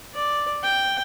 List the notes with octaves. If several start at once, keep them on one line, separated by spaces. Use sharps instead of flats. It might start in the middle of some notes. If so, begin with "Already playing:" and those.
D5
G5